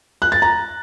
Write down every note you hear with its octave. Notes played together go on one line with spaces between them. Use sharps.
F#6
A6
A#5